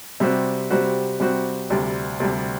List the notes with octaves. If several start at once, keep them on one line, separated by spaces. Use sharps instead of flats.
C3 G3 C4 F#4
C3 G3 C4 F#4
C3 G3 C4 F#4
D2 C3 G3
D2 C3 G3